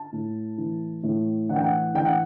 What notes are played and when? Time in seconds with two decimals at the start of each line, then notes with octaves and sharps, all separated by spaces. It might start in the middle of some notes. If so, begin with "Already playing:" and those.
Already playing: A5
0.13 A2
0.58 E3
1.03 A2
1.49 E3 F#5
1.56 G5
1.64 F#5
1.95 E3 G5
2.05 F#5